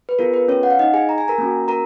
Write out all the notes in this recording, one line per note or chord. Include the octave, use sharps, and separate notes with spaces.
B4
B3 F4 G#4 A#4
B4
C#4 C#5
F#5
F5
D#4 D#5
G#4 G#5
A#5
G#5
A#4 A#5
A#3 C#4 F#4
A#4 A#5